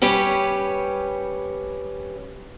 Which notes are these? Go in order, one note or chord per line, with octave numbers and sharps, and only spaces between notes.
G3 C#4 G4 B4 C#5